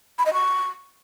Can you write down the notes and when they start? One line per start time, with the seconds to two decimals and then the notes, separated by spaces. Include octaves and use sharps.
0.18 B5
0.26 D#5
0.33 C#6